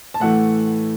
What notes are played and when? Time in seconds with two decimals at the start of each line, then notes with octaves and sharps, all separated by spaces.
0.14 A5
0.20 A2 E3 A3 F#5